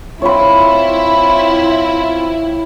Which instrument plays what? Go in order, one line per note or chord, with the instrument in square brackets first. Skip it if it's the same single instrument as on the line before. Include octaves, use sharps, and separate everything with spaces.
[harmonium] C4 F4 [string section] E4 [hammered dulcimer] C#5 B5